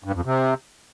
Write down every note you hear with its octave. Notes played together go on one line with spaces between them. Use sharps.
G2
F2
C3